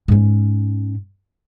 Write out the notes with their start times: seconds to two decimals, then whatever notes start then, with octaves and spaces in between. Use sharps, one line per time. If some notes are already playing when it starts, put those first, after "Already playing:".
0.08 G#2 C#4